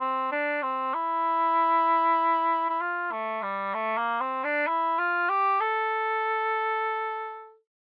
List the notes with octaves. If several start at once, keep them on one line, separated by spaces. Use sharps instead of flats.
C4
D4
C4
E4
E4
F4
A3
G3
A3
A#3
C4
D4
E4
F4
G4
A4